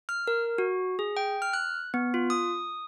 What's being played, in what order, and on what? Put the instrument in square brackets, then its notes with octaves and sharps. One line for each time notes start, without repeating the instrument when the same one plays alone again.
[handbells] F6
A#4
F#4
G#4
G5
F6
F#6
B3
F4
D#6